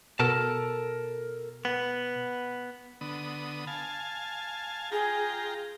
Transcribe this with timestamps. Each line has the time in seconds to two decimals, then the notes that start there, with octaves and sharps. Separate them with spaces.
0.20 B2 A4 A#4 A5
1.65 B3
3.01 D3 B3 D#6
3.67 F5 G#5 A5
4.92 F4 G#4 G5 A#5